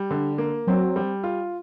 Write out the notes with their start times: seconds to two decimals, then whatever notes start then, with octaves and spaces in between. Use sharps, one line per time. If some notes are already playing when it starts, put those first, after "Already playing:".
Already playing: G3
0.11 D3
0.38 A#3
0.67 F#3 C4
0.96 G3
1.24 F4